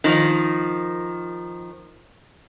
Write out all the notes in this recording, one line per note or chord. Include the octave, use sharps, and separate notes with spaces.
D#3 F3